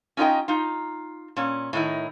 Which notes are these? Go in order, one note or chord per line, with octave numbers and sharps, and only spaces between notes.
C#4 D#4 F4 C#5 D#5 G5
D#4 F4
A#2 C#4
A2 D#3 D#4 E4